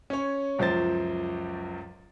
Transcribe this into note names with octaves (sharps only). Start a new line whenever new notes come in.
C#4 C#5
C#2 F#2 F3 C5 A6